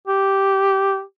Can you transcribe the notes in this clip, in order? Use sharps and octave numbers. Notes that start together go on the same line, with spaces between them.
G4